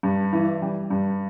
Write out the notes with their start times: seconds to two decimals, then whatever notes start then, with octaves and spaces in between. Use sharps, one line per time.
0.03 G2
0.33 E3
0.62 G3
0.90 G2